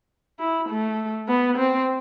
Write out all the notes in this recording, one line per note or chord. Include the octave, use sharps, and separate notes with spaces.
E4
A3
B3
C4